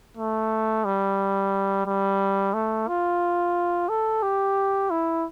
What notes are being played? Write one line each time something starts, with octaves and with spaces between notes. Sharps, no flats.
A3
G3
G3
A3
F4
A4
G4
E4